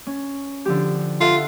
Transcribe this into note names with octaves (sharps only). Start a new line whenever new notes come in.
C#4
D3 F3 G4
F4 A4 E5 F#5